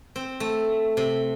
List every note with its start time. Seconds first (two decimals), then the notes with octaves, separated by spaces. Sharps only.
0.16 C4
0.40 A3
0.97 C3